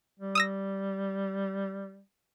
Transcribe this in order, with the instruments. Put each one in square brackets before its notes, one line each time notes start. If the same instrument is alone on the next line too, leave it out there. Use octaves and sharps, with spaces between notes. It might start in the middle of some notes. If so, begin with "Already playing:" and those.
[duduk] G3
[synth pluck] D#6 E6 A#6